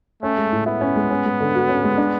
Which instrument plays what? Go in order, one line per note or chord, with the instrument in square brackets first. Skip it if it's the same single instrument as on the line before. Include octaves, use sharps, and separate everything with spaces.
[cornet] A3 [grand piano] C#4
[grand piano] G#3
A2
[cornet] B3 [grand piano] E4
[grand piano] C#4
G#3
C#4
G#3
D3
F#4
C#4
G#3
D4